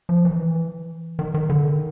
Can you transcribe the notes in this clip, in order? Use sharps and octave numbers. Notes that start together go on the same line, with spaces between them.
F3
E3
D#3
D#3
D3
D#3